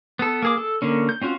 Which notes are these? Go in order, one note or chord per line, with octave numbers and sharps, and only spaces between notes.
B3 A4
A#3 G#4 D6
A4
D3 A#3 C#4
G6
C4 C#4 F4 F#4